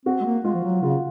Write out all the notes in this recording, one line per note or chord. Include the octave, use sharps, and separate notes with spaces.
C4 F#4
G#3
A#3
G#3 F4
F3
F#3
C#3 F4